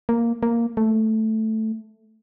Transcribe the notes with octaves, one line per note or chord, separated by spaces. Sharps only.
A#3
A#3
A3